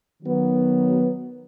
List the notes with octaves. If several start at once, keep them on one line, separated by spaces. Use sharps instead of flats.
D#3 F#3 B3